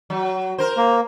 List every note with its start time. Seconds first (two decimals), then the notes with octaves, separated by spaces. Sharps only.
0.10 F#3
0.58 A#4 C5
0.77 A#3